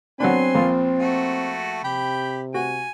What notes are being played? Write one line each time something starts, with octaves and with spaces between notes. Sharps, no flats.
F#3 B3 C4 D4 G#5 C6
A#1 F4
A3 F#4
C3 G4 G5 B5
F#4 G#5